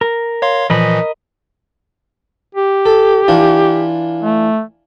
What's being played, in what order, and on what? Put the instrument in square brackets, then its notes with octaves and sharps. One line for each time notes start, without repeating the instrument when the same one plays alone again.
[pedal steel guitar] A#4
[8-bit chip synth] C#5 F5 C6
[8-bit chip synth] A#2 E3 F3 [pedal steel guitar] A#4 D#5 B5
[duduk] G4
[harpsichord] A4
E3 D4 F4
[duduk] A3